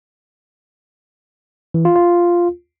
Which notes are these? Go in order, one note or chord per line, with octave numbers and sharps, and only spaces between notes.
E3
F4
F4